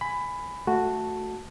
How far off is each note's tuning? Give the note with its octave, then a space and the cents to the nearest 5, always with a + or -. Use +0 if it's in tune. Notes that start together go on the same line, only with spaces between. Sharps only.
G#5 +0 B5 +15
A3 +0 F#4 -5 A5 +0